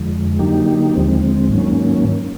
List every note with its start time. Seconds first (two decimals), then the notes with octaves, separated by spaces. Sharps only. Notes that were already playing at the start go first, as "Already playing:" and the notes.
Already playing: F2 D3 F3 G#3
0.39 D3 F#3 A#3 D#4 G4
0.94 D#2 D3 F3 G#3 C4
1.49 G#2 D#3 F#3 A#3 C#4